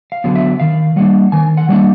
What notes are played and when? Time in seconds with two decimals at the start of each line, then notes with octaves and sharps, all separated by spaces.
0.12 F5
0.24 D3 F#3 B3
0.35 E5
0.60 D#3 F5
0.96 G3 A#3 D4 F#5
1.32 D#3 G#5
1.57 F#5
1.69 G3 A#3 D4 F#5